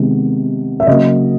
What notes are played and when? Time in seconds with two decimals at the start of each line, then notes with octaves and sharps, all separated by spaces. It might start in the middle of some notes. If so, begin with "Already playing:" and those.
Already playing: C3 D#3 G#3 B3
0.80 E5
0.87 C#3 F#3 A#3 D#5